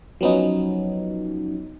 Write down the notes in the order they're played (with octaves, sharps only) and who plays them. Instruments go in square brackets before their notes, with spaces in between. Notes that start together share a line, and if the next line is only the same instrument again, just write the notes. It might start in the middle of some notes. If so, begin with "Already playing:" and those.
[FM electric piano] F3 F#3 B3 C#4 D#4